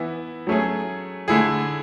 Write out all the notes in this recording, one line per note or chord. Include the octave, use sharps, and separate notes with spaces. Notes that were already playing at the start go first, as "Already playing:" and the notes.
Already playing: E3 B3 E4
F#3 A3 C#4 G#4
D3 A3 E4 G#4